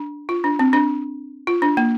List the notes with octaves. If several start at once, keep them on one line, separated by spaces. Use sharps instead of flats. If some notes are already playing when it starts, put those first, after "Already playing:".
Already playing: D4
F4
D4
C4
D4
F4
D4
A#3